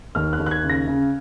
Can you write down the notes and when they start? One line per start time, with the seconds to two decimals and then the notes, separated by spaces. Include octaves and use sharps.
0.15 D#2 F6
0.33 F#6
0.40 D#2
0.46 F#6
0.51 G#6
0.64 C#3
0.70 A#6
0.87 C#3